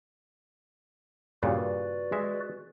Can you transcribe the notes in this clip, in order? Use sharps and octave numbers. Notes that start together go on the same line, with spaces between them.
G2 A#2 C#3 F#4 B4 D5
G#3 E5